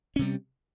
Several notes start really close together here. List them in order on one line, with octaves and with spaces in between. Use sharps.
C#4 C3 G3